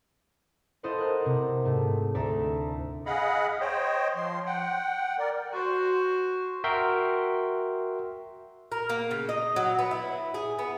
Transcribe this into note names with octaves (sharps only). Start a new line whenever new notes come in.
E4 A4 C5 D#5 F5 F#5
A#4 F#6
C3
G#2 A3
D2 A4 D5 E5 A#5
G#4 D#5 F5 F#5 B5
C5 C#5 D#5 G5
F3 C6
F#5 G5
A#4 D5
F#4 C5
F#4 A#4 E5 G5 C6
A#4
A#3
C#3
D#5
F#3
B3
E4
G#4
B3